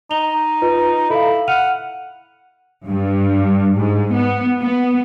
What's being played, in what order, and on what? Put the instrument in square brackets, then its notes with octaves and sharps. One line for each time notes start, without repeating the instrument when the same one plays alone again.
[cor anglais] D#4 [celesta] F7 G7
[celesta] F4 B4 D#5
[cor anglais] E4 [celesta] A4 F5
[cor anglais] F#5 [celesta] F6 D#7 F7
[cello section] G2
G#2
B3
B3